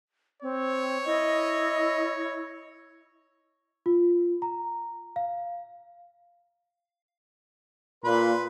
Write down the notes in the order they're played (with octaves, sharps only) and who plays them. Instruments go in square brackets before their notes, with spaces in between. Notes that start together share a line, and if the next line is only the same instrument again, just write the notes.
[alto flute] C4 [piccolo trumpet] C#5
[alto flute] E4 [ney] D#5
[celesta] F4
A#5
F5
[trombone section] A#2 [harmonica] B4 B5 C6